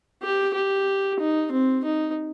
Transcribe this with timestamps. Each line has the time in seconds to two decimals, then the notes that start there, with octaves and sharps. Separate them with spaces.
0.22 G4
0.54 G4
1.19 D#4
1.52 C4
1.84 D#4